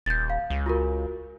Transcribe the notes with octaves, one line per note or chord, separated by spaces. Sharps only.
D#1 G6 A6
F5
C#2
F4 F#4 A#4